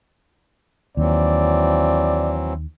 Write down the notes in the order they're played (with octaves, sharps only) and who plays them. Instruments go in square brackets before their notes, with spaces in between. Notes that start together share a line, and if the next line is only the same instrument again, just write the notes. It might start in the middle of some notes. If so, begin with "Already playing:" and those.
[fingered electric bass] D#2 [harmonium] E3 F#3 C4 [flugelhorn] D5